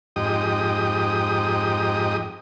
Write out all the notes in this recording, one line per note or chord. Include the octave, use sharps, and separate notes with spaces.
F2 G#2 D#4 G4 D#6